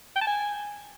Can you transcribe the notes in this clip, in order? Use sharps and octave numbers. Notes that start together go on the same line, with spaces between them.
G5
A5
G#5